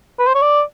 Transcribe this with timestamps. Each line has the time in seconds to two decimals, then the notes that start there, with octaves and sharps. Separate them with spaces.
0.19 B4
0.27 C5
0.35 C#5
0.42 D5